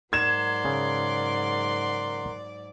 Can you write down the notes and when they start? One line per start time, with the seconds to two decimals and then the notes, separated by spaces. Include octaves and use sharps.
0.13 G#2 F#3 A#4 D5 F#5 C6 G#6 E7
0.65 C#3